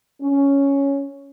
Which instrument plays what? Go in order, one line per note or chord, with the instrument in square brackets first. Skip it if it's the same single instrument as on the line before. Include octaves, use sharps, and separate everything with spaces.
[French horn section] C#4